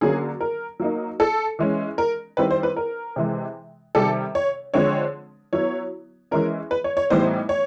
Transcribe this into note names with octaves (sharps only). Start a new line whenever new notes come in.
D3 F#3 A#3 C#4 G#4
A#4
F#3 A#3 D#4
A4
E3 G#3 C#4
A#4
D#3 G3 C4 E4 B4
C5
B4
A#4
C3 E3 G#3
C3 D#3 G3 A4
C#5
D3 F3 G#3 C4 C#5
F#3 B3 E4 C#5
E3 G#3 C#4 A#4
B4
C#5
C#5
A2 E3 G3 B3 D#4 C5
C#5